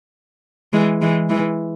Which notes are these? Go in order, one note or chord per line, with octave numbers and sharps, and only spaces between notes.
E3 G#3
E3 G#3
E3 G#3